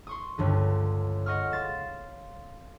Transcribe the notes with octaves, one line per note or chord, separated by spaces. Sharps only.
C6 C#6 D#6
C#2 G2 D3
D#5 F#5 C#6 D#6 F6
F5 C6 A6 E7